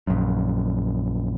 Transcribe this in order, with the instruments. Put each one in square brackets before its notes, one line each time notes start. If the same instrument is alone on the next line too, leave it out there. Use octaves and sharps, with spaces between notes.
[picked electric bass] A#1 F#2